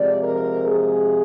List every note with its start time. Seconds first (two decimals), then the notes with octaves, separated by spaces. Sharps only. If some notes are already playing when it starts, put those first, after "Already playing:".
Already playing: C3 F3 G#3 D5
0.23 A#4
0.64 G#4